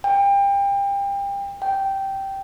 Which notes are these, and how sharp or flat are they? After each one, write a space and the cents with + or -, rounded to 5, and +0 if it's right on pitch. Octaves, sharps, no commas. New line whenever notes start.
G5 +30
G5 -10